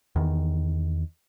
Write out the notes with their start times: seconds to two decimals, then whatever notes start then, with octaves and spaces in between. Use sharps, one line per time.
0.16 E2 D#3